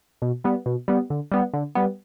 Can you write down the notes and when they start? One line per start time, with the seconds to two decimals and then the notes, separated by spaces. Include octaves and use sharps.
0.22 B2
0.44 G3 B3
0.66 B2
0.88 G3 B3
1.10 D3
1.32 G3 B3
1.54 D3
1.75 G3 B3